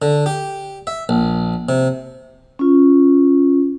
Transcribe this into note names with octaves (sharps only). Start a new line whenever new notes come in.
D3
G4
E5
A#1
C3
C#4 F4